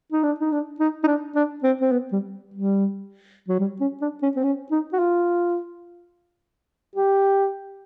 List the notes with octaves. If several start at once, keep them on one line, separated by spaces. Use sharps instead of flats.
D#4
D4
D#4
D4
D#4
D#4
D4
D4
C4
C4
B3
G3
G3
F#3
G3
C#4
D4
C#4
C4
C#4
D#4
F#4
F4
G4